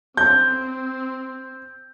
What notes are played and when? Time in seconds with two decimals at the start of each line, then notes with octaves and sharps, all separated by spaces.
0.17 C4 G6